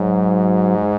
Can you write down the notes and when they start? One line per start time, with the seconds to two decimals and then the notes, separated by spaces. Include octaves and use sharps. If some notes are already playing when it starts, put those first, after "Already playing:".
Already playing: G#2 F#3
0.76 G#3